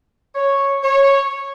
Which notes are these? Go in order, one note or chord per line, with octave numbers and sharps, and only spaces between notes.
C#5
C#5